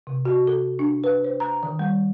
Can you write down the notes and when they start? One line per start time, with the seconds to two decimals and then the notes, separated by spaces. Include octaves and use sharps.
0.07 C3
0.25 F#4
0.47 A4
0.79 D4
1.04 B4
1.24 C5
1.40 A#5
1.63 D#3
1.79 G3